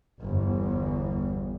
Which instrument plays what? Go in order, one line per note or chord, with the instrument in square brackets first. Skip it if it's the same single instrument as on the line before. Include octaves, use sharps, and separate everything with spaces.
[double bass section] G1 E2